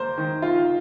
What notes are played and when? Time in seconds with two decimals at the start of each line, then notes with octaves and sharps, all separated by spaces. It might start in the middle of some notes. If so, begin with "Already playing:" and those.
Already playing: A#3 C5
0.18 D#3
0.42 F4